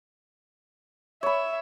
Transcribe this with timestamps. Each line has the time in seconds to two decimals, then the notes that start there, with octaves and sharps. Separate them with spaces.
1.23 C#5 E5 B5